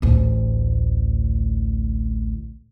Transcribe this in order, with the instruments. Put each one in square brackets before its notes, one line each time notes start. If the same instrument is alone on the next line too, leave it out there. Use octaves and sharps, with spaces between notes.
[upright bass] A1 D2